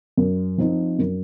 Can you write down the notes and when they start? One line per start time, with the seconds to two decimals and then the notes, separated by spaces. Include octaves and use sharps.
0.17 F#2
0.58 F3 C4 D#4
0.99 F#2